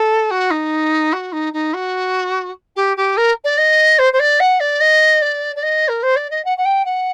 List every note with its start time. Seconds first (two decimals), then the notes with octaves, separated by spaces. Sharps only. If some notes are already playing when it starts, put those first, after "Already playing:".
Already playing: A4
0.30 F#4
0.50 D#4
1.13 F#4
1.32 D#4
1.53 D#4
1.73 F#4
2.76 G4
2.97 G4
3.17 A#4
3.44 D5
3.57 D#5
3.98 C5
4.13 C5
4.19 D5
4.40 F#5
4.60 D5
4.80 D#5
5.21 D5
5.55 D5
5.63 D#5
5.88 A#4
6.02 C5
6.16 D5
6.30 D#5
6.44 F#5
6.57 F#5
6.65 G5
6.85 F#5